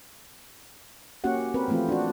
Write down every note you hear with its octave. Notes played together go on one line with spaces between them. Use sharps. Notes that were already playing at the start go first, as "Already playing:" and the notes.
A#3 C#4 F#4 G4 F#5
C4 A#4 B4
E3 F3 A3 C4 F4
D4 F#4